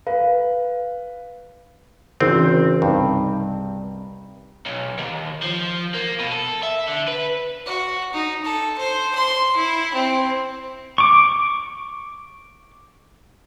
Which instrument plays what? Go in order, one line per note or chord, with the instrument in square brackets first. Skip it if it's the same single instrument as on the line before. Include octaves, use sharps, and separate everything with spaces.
[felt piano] B4 [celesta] F5
[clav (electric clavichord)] G#1 C4 [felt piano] C#3 E3
[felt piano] C2 D#4 [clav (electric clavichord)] G2
[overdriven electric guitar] B1
D#2
F3
A#3
B2
A4
E5
D3
B4
[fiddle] F#4
D#4
A4
C5
C6
E4
C4
[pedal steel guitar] C#6 D6